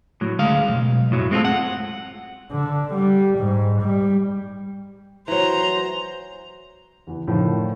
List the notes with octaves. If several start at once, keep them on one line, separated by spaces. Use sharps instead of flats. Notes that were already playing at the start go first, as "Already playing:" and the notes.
A2 F#3
D2 G#3 F5
B1 F2
F#2 A2 F#3
G#3 C4 F4 A4
F#5
D3
G3
G#2
G3
E3 F#3 C5 A#5
E2 E3
A2 D3 D#3 F3